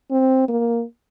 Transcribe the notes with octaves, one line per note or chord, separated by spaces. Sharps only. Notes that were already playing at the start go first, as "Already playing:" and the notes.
C4
A#3